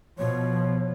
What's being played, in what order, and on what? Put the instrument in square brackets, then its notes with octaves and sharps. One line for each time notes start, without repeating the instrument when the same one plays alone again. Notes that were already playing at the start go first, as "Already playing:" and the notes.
[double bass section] B2 F3 [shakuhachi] C#5